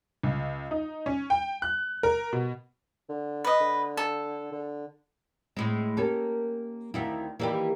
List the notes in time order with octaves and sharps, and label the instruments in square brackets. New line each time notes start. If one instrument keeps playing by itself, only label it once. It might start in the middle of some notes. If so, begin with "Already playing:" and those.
[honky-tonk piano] C#2
D#4
C#4
G5
F#6
A#4
B2
[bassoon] D3
[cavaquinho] B4 D#5
[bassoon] D3
[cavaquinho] A4
[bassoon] D3
[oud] A2 G#3 [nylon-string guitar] C4
[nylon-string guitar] A#3 G4 A#4 [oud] C#4 A4
[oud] D2 D#3 C4 [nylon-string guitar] E4 E5 F5
[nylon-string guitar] D#3 A#3 [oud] E3 G3 G4